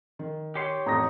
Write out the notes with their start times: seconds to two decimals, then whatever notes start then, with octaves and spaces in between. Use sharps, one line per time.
0.19 D#3
0.55 G4 C#5 C6
0.86 A1 F2 A2 A#5 D#6 A#6